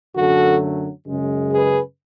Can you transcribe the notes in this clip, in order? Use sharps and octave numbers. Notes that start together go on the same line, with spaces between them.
F#2 D3 F#3 A3 F#4 A4
F#2 C#3 G#3
G#4 B4